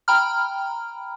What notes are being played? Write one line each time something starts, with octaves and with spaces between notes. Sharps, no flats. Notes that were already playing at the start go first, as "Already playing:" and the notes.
G5 A#5 B5 F6